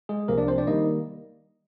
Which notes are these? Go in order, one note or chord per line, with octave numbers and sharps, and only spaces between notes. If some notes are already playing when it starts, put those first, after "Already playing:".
G#3 G#4
C2 C3 F3 A#3 A#4
D4 D5
C4 C5
D4 D5
D#3 G3 A#3 D#4 D#5